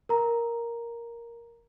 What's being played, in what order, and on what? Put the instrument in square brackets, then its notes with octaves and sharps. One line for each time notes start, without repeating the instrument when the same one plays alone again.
[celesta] A#4 A#5